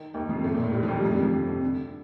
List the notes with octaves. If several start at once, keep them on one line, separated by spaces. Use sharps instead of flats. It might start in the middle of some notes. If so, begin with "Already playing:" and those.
Already playing: D#3
D#2 D#3
F2 F3
A2 A3
A#2 A#3
A2 A3
G2 G3
F3
D#2 D#3
G3
F2 F3
G2 G3
F2 F3
D3
C3
D3